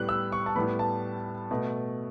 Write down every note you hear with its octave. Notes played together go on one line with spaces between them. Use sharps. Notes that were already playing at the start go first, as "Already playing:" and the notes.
Already playing: A2 G3 B3 F#6
E6
C#6
A5
A2 G3 B3 B5
A5
B2 A3